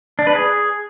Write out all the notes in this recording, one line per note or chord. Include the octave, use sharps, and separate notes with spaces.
D4
B4
G#4